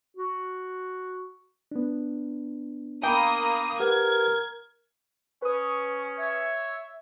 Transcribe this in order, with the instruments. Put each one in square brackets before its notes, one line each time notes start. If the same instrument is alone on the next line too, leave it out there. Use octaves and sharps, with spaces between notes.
[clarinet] F#4
[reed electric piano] B3 D4
[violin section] A#3 D#6 [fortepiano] G5 A#5 B5
[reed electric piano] G4 B4 F#5 [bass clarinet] A#4 [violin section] G#6
[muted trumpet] C#4 [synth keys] B4 D#6 [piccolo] C#6
[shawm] C#5 [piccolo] E5